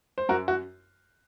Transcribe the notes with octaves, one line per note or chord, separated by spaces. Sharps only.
C5
F#2 F#4 A#4
F#4